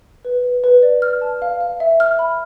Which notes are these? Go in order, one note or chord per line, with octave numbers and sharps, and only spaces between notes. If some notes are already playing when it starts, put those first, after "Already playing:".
B4
B4
B4
D5
F6
A5
F5
F5
E5
F6
B5